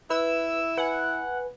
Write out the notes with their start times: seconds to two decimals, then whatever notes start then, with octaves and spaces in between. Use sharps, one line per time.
0.10 E4 B4 E6
0.77 B4 F#5 G#5